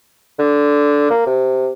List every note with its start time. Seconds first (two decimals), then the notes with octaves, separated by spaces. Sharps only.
0.39 D3
1.10 A#3
1.26 C3